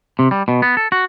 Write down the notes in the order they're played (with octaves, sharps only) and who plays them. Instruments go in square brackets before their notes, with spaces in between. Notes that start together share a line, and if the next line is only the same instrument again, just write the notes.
[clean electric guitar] C3
G3
B2
B3
A4
F#4